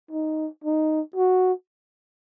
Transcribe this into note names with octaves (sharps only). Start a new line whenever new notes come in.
D#4
D#4
F#4